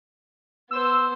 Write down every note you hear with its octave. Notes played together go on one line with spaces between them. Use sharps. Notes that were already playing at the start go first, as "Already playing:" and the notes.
B3 C5 E6